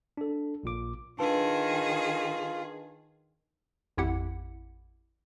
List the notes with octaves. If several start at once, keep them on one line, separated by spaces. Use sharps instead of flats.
D4 A4
A#1 A#2 D6
D#3 D4 F4 G#4 B4 A5
A1 F2 E4 G4 F#5